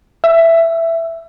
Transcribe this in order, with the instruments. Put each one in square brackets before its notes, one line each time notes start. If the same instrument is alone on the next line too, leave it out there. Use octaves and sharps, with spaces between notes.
[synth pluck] E5